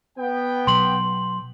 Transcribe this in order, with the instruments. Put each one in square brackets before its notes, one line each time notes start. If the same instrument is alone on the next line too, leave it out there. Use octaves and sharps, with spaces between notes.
[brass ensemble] B3 G5
[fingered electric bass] B2 F#3 [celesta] C6 F#7